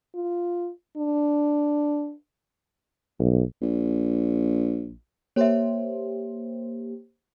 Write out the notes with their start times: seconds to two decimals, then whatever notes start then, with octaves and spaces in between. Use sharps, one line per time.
0.15 F4
0.97 D4
3.19 B1
3.61 A#1
5.36 A#3 G4 C5 C#5 E5